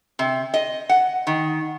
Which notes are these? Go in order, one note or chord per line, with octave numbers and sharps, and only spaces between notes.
C3
D#5
F#5
D#3